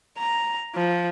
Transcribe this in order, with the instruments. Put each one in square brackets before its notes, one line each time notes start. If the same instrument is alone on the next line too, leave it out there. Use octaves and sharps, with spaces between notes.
[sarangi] A#5
F3